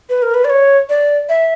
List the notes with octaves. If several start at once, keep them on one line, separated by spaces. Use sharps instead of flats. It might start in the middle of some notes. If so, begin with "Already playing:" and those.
B4
A#4
B4
D5
C#5
D5
E5